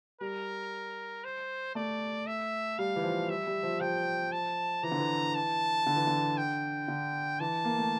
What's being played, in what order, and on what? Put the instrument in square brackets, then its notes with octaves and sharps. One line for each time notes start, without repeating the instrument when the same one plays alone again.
[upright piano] G3 [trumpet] A#4
[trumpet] C5
[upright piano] A3 [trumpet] D5
[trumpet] E5
[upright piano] G3 [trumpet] F5
[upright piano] E3
F3
[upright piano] G3 [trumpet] E5
[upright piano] G3
F3
[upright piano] F3 [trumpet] G5
[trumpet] A5
[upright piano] E3 [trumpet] A#5
[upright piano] D3
E3
[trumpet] A5
[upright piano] D3
E3
D3
[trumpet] G5
[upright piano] D3
[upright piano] E3 [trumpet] A5
[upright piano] A#3
A3